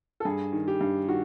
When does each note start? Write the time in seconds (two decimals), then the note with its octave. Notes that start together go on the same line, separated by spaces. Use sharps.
0.20 A4
0.25 G2 G#4
0.53 D#3
0.68 G4
0.81 G2
1.08 D#3 F#4